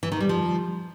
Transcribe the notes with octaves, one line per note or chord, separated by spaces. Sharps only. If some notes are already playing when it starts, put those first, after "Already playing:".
E3
D#3
G3
F3